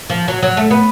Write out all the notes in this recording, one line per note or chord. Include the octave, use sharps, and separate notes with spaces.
F3
F#3
F#3
A3
B3